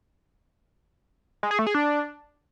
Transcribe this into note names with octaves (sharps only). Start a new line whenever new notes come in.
G#3
G#4
A3
G#4
D4